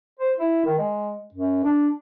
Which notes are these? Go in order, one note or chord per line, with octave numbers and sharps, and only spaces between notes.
C5
E4
D#3
G#3
F#2
D4